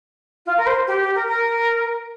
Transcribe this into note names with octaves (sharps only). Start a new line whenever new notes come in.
F4
A#4
C5
G4
G4
A#4
A#4